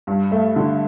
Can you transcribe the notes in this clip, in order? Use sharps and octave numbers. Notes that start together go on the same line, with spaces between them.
G2
A3
D3